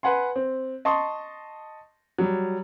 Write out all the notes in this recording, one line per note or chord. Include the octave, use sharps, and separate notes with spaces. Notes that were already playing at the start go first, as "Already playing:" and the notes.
B4 F#5 G#5 C6
C4
D#5 A5 C6 C#6 D#6
F#3 G3